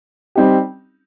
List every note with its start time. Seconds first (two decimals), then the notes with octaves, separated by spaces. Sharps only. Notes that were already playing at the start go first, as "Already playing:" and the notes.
0.35 G3 C4 D#4 G4